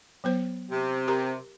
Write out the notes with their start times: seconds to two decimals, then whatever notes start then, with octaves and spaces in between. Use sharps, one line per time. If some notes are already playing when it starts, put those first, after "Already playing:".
0.24 F#3 B3 C5
0.70 C3
1.08 G4 A#4 A#5